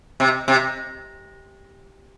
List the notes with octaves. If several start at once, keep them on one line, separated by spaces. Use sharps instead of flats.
C3
C3